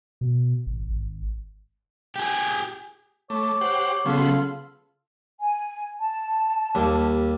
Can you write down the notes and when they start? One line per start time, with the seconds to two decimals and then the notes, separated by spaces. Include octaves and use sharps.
0.21 B2
0.67 G#1
0.90 G#1
2.16 G4 G#4
3.30 A3 C#5 D6
3.61 G4 C5 F#5
4.06 C#3 F#3 B3 F4 A4 F5 C6
5.40 G#5
5.99 A5
6.75 D#2 G3